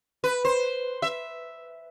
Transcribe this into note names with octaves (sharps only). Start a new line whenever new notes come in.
B4
C5
E5